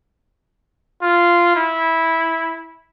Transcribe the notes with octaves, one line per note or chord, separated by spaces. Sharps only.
F4
E4